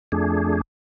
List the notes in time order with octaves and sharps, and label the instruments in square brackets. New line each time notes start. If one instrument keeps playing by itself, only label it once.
[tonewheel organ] F2 A3 D4 G#4